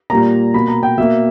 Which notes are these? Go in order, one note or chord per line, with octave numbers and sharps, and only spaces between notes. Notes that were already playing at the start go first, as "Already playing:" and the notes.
A#2 G3 A#3 A#5
B2 A#3 B5
A#5
G5
B2 A#3 E5